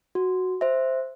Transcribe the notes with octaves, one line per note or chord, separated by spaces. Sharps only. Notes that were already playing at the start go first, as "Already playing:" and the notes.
F#4
C5 E5